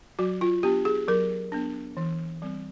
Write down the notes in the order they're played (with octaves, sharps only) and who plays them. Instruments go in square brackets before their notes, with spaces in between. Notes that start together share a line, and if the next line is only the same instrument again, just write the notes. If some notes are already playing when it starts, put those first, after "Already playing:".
[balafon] F#3 F#4
F4
B3 D4 G4
G#4
F#3 A#4
B3 D4
E3
G3 C4